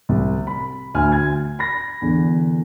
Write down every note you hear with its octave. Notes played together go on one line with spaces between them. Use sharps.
C2
B5
D2 G#5 F6
G#6
B5 A#6
E2 D3